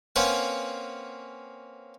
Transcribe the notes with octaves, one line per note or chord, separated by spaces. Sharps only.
A#3 C4 C#4 B4 F#5 G#5